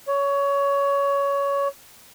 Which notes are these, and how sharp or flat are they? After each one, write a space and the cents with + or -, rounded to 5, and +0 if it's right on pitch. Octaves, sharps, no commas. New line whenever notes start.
C#5 +20